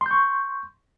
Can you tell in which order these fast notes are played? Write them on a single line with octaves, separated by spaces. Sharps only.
C6 G6 C#6